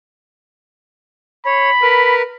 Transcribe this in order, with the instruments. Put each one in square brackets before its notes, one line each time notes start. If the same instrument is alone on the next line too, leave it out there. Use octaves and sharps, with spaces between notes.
[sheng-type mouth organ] C#5 [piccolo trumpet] B5
[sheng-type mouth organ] A#4 B4